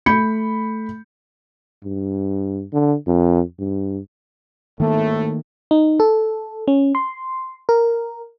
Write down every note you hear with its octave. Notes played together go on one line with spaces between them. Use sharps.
A3 B5 G6 C#7
G2
D3
F2
G2
G#1 A2 D#3 A3 A#3
D#4
A4
C#4
C6
A#4